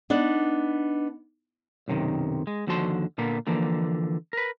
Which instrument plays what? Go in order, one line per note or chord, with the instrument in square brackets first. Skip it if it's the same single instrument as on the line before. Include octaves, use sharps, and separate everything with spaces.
[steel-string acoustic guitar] B3 D4 D#4
[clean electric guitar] B1 F#2 C3 D#3
G#3
D#2 D3 F3 F#4 A5 C6
A#2 D3 A#3 B3
D3 E3 F3 A#3
A#4 B4